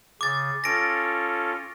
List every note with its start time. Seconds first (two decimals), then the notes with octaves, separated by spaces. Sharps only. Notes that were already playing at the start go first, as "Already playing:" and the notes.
0.21 C#3 D6 A6
0.64 C#4 F4 A4 A#6 D7